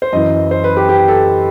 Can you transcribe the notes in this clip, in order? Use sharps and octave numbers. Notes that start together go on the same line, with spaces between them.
C5
F#2 E3 D#5
C5
B4
G4
G4
A4